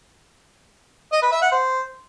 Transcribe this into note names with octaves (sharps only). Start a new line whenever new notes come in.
D#5
B4
E5
F#5
C5